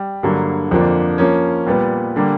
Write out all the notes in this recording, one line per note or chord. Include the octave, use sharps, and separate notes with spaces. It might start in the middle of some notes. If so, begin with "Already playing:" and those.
Already playing: G3
G2 D3 F#3 A#3
F2 D3 F3 A#3 D4
F3 A#3 C#4
A#2 G3 B3
D3 G3 A#3